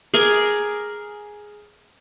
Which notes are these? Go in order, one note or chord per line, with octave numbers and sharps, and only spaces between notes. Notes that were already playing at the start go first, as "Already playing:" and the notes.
G#4 A#4 D6